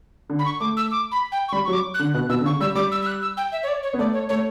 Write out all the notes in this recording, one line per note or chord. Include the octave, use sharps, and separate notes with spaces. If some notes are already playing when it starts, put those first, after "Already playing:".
D3
B5
C#6
A3 D6
E6
D6
B5
G5
C#6
G3 B5
F#3 C#6
D6
F#6
D3
B2 F#6
B2 E6
D3
C#3 C#6
G3 E6
G3 D6
E6
E6
F#6
E6
G5
E5
C#5
D5
C#5
B3
A3 D5
C#5
A3 C#5